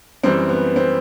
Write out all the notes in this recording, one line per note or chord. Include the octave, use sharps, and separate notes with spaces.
F#2 E3 G3 C4
B3
C4